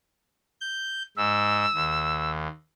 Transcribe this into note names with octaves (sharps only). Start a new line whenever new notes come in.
G6
G#2 E6
D#2